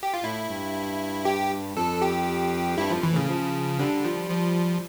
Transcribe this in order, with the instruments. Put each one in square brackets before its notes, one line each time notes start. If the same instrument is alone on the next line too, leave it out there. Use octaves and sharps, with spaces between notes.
[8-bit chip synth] G4
F4
[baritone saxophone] A2 [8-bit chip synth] E4
[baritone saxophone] G2
[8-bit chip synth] G4
[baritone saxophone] F2 [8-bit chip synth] A4
[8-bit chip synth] G4
[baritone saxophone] G2 [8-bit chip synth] E4
[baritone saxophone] F2 [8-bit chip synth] F3
[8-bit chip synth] E3
[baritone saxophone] A2 [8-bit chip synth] C#3
[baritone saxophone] F3
[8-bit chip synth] D3 [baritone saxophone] G3
[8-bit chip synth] F3
F3